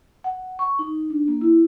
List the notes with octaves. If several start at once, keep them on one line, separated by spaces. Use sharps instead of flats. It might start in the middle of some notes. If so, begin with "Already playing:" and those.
F#5
C#6
D#4
D4
A#3
E4